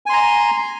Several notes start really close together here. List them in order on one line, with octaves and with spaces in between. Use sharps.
G#5 C6 A#5